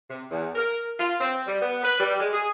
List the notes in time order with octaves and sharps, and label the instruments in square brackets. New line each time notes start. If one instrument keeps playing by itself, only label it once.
[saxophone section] C3
E2
A#4
F4
C4
G3
B3
B4
G3
G#3
G#4